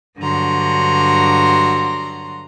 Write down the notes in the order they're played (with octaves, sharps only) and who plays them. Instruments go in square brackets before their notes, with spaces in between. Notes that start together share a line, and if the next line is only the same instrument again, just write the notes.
[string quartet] G2 D3 F#3 F#4 A#5 C6